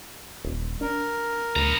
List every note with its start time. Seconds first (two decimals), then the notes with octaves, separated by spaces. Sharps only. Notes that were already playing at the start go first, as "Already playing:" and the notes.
0.45 D#1
0.81 D4 A#4
1.56 D2 B3 A#5